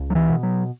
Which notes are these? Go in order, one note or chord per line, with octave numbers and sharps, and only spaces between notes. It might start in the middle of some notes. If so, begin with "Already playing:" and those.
Already playing: C#2
F#3
E3
B2
F#3